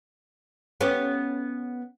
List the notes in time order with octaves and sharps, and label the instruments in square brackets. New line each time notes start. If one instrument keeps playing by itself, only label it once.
[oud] B3 C#4 G4